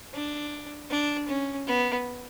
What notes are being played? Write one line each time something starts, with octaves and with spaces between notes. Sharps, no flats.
D4
D4
C#4
B3